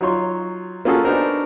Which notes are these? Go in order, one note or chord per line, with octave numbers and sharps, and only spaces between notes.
F#3 D#4 F4 C#5 C6
A#3 C#4 F4 F#4 G#4 A4
B3 D4 D#4 F#4 A#4 C5